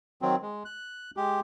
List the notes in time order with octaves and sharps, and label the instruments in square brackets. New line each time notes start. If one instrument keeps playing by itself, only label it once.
[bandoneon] D#3 F#3 C4
G#3
F#6
G#3 G4